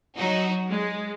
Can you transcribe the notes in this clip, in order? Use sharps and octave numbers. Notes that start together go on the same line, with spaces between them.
F#3 D#4 F#4
G#3